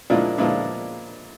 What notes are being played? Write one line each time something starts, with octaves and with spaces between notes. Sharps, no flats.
A#2 F3 G#3 D4 E4
A#2 F3 G#3 D4 E4